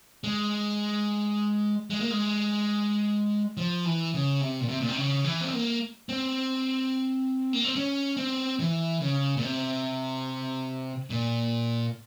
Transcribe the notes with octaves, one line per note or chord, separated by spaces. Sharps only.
G#3
G#3
A#3
G#3
F3
E3
C#3
C3
A#2
C3
A#2
C3
C#3
E3
C4
A#3
C4
A#3
C4
C#4
C4
E3
C#3
A#2
C3
A#2